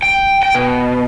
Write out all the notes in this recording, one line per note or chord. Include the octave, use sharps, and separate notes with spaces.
G5
G5
B2